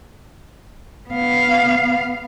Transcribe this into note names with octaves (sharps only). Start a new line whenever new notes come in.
B3 F5